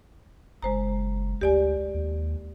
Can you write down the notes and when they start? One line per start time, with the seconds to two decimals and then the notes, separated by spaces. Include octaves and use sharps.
0.63 F#1 G#3 C5 A#5
1.41 D2 G4 D5 G#5
1.94 D#2